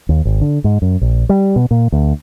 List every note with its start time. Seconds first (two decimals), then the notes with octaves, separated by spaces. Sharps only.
0.09 D#2
0.25 G#1
0.41 D3
0.64 G#2
0.82 F#2
1.01 A#1
1.29 G3
1.56 B2
1.71 A#2
1.92 D2